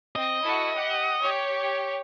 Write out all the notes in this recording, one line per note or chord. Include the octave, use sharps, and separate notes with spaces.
C4 D#5
E4 F#4 A4
G4 F#5
G4 C#5